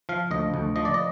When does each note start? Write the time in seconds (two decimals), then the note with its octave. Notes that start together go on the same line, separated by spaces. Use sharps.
0.09 F3 F5
0.31 D2 D#5
0.54 D2
0.76 F3 D#5
0.85 D5
0.94 D#5